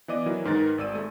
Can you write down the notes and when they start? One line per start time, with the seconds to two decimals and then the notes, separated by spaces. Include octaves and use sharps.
0.08 E3 B3 D5 D#5 D6 D#7
0.26 E3 F#3 E4 A#4
0.45 G#2 D#3 D#4 A#4 B4 A6
0.78 G#1 D5 E6 D#7
0.93 G#3 A3